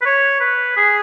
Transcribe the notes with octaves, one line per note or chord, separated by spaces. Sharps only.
B4
C#5
B4
G#4